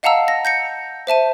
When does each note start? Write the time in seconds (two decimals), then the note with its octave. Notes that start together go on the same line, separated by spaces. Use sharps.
0.03 D#5 F5 F#5 A5 A#5 E6
0.28 A#6
0.45 G6 A#6 C#7
1.07 C5 E5 A5 D#7